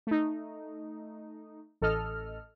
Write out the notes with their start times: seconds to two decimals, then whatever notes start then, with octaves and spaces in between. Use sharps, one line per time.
0.07 A3 D#4
1.82 A1 A4 D#5 F6